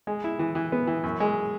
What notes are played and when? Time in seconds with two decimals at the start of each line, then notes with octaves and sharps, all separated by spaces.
0.07 G#3
0.24 E4
0.39 E3
0.55 E3
0.72 B3
0.87 E3
1.03 F#2
1.20 G#3